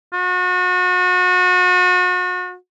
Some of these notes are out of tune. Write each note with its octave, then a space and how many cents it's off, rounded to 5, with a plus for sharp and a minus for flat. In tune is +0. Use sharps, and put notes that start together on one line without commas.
F#4 -35